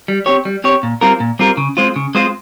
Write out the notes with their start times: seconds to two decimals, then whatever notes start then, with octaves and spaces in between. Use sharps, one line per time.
0.08 G3
0.26 C4 G4 C#5
0.45 G3
0.64 C4 G4 C#5
0.83 A#2
1.01 G3 C4 F4 A#4
1.20 A#2
1.39 G3 C4 F4 A#4
1.57 C#3
1.77 G#3 C4 F4 C5
1.96 C#3
2.15 G#3 C4 F4 C5